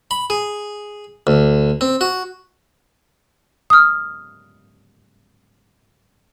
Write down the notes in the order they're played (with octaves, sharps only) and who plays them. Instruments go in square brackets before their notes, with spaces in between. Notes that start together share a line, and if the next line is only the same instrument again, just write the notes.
[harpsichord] B5
G#4
D2
C4
F#4
[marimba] D#6 F6